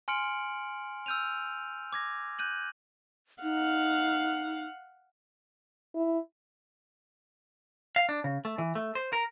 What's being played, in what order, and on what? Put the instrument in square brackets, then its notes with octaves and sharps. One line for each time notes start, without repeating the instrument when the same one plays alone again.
[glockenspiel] G#5 C6 F6 C#7 D7 F#7
E6 F6 G6 D#7 F7
D6 G#6 A#6
F#6 G6 D#7 F#7
[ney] D#4 [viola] F5 F#5
[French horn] E4
[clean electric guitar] F5
D4
C#3
A3
E3
A3
C5
A#4